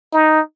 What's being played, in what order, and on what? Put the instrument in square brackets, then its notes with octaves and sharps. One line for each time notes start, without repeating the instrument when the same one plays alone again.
[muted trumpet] D#4